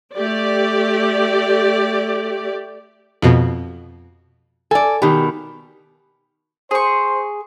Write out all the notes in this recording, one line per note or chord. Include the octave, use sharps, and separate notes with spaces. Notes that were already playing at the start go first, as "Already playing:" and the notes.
A3 G4 D5
F2 B2
A4 D5 G#5
B2 D#3 G4
G#4 C5 C#6